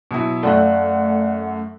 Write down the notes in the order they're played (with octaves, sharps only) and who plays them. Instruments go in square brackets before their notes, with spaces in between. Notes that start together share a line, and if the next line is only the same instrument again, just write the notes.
[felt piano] B2 F#3 E4
[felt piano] F#2 F#6 [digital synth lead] A3 [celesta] D5 F5 [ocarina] F#5